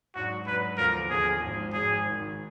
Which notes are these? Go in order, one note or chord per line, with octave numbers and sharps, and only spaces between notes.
G#2 F#3 D4 F#4
G#2 F#3 D4 B4
D#2 D3 F3 B3 F4 A#4
D#2 D3 F3 B3 F4 G#4
G#1 G#2 F3
G#1 G#2 F3 G#4
G#1 G#2 D#3